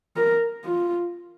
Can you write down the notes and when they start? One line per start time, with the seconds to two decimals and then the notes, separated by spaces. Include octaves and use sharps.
0.16 A#4
0.64 F4